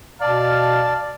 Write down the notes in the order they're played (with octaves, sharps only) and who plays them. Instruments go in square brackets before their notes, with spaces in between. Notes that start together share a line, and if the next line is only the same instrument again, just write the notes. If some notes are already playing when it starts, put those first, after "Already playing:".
[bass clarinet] B2 [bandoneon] D5 [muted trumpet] F5 [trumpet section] A5